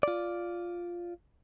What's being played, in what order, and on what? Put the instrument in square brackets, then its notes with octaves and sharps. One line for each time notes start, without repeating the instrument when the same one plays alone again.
[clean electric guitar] F4 D5